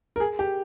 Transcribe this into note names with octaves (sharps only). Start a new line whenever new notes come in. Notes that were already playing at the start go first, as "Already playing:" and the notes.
A#4
G#4
G4